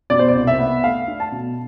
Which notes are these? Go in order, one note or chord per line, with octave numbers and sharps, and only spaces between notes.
B2 D5
C5
D5
C2
E5
B3
A3 F5
D4
A5
B2